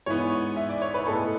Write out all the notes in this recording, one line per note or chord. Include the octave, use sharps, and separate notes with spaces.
G#2 E3 B3 C#5
E5
D5
C#5
B4
A2 G#3 B3 A4